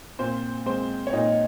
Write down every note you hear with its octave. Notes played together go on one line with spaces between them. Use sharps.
A#2 C4 C5
G#3 C4 C5
C#5
A#2 D#4 D#5